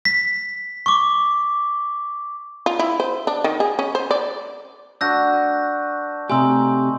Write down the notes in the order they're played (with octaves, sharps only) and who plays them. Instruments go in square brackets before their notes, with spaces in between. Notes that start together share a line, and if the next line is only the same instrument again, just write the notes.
[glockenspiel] B6
C#6 D6
[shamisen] F4
E4
C5
D4
D#3
G#4
C#4
C5
D5
[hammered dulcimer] D4 F#4 B4 [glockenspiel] E6 G6 A#6
[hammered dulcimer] B4
[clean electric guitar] C3 G4 [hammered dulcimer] A3 D#4 [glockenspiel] G#5 C6 E6